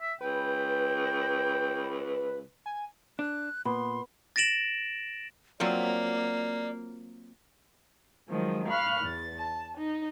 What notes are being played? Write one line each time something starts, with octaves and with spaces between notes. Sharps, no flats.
E5
C#2 B4 G5
G#5
D4 F#6
A#2 B3 C6
A6 A#6 D7 E7 F#7
F#3 A#3 C4 F4 D5
D#3 F3 F#3 G#3
F5 B5 C#6 F6 F#6
E2 A6
A5
D#4